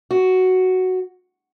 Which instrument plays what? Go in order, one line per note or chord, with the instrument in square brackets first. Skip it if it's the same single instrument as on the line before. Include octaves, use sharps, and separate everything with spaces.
[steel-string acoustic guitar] F#4